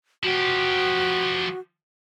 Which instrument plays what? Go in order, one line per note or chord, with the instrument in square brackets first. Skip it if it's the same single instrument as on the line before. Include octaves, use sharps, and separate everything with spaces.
[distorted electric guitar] F3 G4 [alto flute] F#4